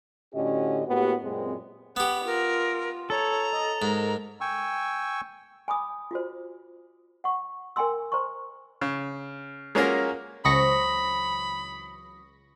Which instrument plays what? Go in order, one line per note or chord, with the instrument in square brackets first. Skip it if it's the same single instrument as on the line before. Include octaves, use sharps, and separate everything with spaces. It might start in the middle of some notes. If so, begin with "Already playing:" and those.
[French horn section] A2 D3 C#4 F#4 G4 D#5
A2 A#3 B3 F#4 G4
F#2 A#2 G#3 C4
[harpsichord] B3 G4 [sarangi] F#5 [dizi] B5
[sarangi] F4 [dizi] A#4
[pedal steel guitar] A4 [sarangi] C#5 [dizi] A#5
[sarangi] D#5
[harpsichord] G#2 [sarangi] A#4
[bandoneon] G5 G#5 C#6 E6
[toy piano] G#5 B5 D6 D#6
F4 F#4 C5
F#5 C#6
A#4 G5 G#5 A#5 C6 E6
C5 A#5 C6 C#6
[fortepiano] C#3
G#3 A#3 C#4 F4 F#4 A#4
[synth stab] C#2 C#6 A#6 [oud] E3 F#3 C4 [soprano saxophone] B5 [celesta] D#6